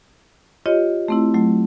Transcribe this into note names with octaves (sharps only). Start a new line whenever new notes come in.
F4 G4 C#5 D#5
A3 C4 E4
F#3 A3